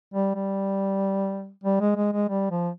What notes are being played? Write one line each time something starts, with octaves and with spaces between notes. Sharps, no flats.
G3
G3
G3
G#3
G#3
G#3
G3
F3